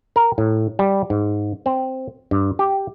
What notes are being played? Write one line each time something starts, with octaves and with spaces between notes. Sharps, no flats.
A#4
A2
G3
G#2
C4
G2
G4